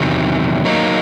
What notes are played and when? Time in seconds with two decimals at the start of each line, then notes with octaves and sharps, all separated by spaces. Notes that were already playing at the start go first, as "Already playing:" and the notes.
Already playing: E2 C3 D#3 F#3
0.65 F#3 A#3 D#4